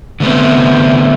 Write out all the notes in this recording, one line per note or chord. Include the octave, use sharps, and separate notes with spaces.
D3 A3 B3 C4